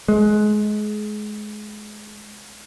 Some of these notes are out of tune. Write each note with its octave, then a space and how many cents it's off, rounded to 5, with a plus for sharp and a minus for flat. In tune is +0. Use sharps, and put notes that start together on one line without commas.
G#3 +25